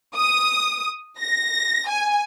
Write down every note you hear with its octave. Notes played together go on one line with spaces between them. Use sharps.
D#6
A#6
G#5